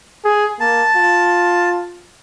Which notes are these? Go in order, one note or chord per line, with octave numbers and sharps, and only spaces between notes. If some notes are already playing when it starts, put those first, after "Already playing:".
G#4
A#3 A5
F4